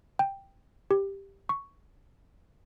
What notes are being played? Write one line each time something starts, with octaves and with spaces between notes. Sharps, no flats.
G5
G4
C#6